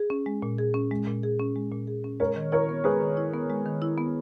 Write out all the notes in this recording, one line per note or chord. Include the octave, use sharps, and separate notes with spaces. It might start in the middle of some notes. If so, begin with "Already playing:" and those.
Already playing: G#4
C#4
G#3
A#2
G#4
C#4
G#3
A#2
G#4
C#4
G#3
A#2
G#4
C#4
G#3 A#4 C#5
D#3
E4 A#4 C#5
B3
G#3 G#4 B4
D#3
E4
B3
G#3
D#3
E4
B3